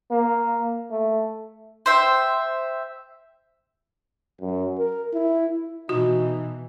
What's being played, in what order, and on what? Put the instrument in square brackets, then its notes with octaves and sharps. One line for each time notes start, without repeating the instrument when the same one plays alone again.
[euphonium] A#3
A3
[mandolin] C5 E5 G5
[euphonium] F#2
A#4
E4
[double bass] B2 E3 [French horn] D#4 [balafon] F#4